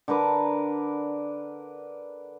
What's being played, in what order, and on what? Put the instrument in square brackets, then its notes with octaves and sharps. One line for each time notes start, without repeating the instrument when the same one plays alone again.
[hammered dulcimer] D3 A#4 B4 D6